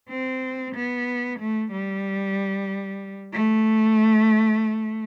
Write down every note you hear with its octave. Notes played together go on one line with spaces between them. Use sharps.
C4
B3
A3
G3
A3